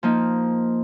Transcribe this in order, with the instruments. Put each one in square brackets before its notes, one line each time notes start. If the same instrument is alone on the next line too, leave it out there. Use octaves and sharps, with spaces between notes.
[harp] F3 A#3 D#4